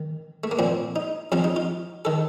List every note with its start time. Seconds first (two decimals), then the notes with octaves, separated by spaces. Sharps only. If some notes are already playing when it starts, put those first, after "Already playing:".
Already playing: D#3
0.44 A3
0.51 A#3
0.59 A#2 F3 C4
0.96 D#4
1.32 F2 C3 F3 F4
1.44 D#4
1.56 F4
2.05 D#3 A4